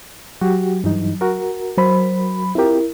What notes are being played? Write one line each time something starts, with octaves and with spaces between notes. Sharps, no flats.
F#3 F#4 G4
G2 E3 D#4
F#4 A#4
F#3 C5 B5
C4 E4 F4 G4 A#4